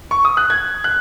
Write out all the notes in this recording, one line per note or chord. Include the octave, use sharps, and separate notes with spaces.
C#6
D#6
F#6
G#6
F#6